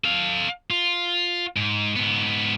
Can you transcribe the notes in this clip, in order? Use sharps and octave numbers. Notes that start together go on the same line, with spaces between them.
A4 F5
F4
G#2
G#2 B3